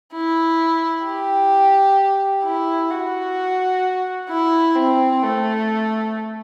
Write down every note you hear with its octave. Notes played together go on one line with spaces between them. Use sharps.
E4
G4
E4
F#4
E4
C4
A3